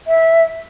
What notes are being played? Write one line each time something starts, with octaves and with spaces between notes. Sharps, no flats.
E5